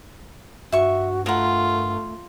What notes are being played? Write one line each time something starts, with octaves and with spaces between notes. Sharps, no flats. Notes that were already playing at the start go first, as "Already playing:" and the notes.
G2 F#4 E5 C#6
A3 F4 A#4 F#5